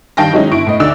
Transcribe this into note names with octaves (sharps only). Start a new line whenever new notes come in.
G2 D#3 F5 G5 A5 A#6
D#3 F#3 G#3 C#4 D#4 E4
G1 E4 D7
A2 D#5
D2 D3 D4 D#4 D5 E6